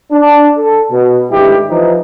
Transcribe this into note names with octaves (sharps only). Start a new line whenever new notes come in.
D4
A4
B2
G#1 D2 G2 G#3 E4 G4
E3 F3 D#4